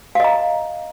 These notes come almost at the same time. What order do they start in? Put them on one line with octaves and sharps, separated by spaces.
F5 D#5 A#5